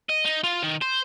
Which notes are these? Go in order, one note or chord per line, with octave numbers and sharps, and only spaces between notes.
D#5
D#4
F4
D#3
C5